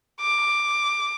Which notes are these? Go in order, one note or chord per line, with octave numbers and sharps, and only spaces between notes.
D6